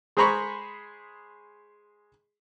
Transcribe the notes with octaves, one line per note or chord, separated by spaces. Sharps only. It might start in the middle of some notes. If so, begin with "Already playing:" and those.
G#3 G#4 C5 A#5 B5 C#6